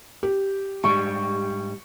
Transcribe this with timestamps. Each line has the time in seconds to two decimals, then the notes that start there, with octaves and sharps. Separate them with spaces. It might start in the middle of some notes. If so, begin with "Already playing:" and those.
0.23 G4
0.84 G#2 G3 C#6